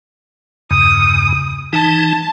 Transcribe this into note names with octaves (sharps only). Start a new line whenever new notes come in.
E2 G2 C#3 D#6
E3 D#4 A5